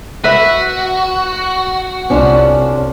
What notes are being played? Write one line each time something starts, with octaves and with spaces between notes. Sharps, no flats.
F#4 B4 E5
C2 C#4 D4 F4